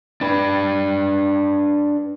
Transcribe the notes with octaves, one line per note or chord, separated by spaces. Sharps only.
D4 B4